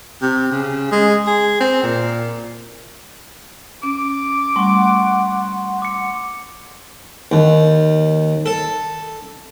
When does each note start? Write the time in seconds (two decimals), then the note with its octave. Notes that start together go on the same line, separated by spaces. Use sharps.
0.22 C3
0.52 C#3
0.92 G#3
1.27 G#4
1.60 C4
1.83 A#2
3.83 C#4 D6
4.56 G3 A3 F#5 C6 C#6
5.82 D6 C#7
7.32 D#2
8.46 A4